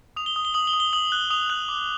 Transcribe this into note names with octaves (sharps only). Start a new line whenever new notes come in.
D#6 F7
G7
D#6
G7
D#6 F#7
G7
D#6
G7
D#6 F#7
F#6
D#6 F7
F#6 F#7
D6